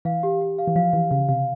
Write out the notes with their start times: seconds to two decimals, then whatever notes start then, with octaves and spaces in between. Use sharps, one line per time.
0.05 E3 F5
0.23 G4
0.41 G4
0.58 F5
0.67 E3
0.76 F3 F5
0.93 E3 G4
1.11 C#3 F5
1.29 C3 F5